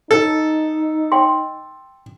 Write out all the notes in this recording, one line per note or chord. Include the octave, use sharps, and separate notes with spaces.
D#4 A4
G5 C6